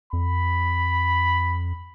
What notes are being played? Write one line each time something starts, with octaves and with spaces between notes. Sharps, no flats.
F2 B5